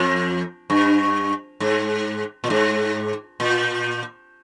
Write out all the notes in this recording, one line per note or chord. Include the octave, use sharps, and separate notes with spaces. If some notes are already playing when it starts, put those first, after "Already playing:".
Already playing: F2
G2
G#2
A#2
G#2
A#2